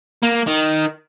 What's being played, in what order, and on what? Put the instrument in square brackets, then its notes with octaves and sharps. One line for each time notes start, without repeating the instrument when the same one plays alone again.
[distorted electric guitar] A#3
D#3